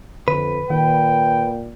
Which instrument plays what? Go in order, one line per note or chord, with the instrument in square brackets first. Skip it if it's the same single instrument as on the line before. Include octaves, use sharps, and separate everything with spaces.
[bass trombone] F2 [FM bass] D3 [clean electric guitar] B4
[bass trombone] A#2 [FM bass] D#3 [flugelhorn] G5